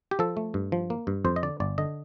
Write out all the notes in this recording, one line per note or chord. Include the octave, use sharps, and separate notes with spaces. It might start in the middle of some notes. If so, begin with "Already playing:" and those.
G4
F3 A4
A3
G2
F3
A#3
G2
F2 C5
D#5
D3 D5
G1 D5
D3 D#5